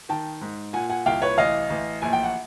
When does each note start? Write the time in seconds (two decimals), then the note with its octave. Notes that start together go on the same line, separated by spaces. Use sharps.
0.09 D#3 G5 A5
0.41 G#2
0.73 A#2 F#5 G#5
0.90 F#5 G#5
1.06 C2 F5 G5
1.22 B4 C#5
1.37 A1 D#5 F5
1.70 A1
2.02 A#1 G#5
2.13 G5
2.23 F#5